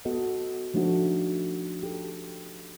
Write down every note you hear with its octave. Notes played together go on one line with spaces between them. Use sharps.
B3 F#4 A4 D#5
F3 A3 D4 D#4 F#4 A4
G4 A4